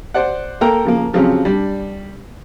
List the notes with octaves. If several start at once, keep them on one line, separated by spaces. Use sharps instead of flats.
C5 D5 F#5
A#3 A4 A#4 G5 A#5
C#3 F3 A#3
C#3 F3 F#3 C4 C#4 G4
G3 D4